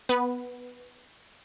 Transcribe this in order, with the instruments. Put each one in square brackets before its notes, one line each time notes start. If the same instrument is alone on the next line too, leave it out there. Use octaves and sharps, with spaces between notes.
[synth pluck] B3 B4